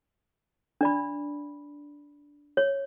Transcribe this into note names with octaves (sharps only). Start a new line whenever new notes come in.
D4 D5 B5
C#5